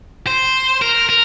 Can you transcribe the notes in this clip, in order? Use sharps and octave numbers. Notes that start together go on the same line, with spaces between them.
C5
A#4
A#4